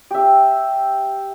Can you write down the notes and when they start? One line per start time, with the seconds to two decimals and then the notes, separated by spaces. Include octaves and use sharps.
0.11 G4 E5